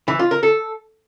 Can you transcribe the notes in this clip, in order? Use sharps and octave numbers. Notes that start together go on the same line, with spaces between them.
E3
F4
A#4
A4